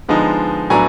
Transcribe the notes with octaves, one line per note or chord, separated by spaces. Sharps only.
D3 F3 G#3 B3 D#4
A2 F#3 B3 D4 G#5 A#5